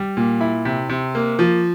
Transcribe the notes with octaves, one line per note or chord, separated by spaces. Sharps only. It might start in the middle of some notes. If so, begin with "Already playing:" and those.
Already playing: G3
A#2
E4
C3
C3
A#3
F3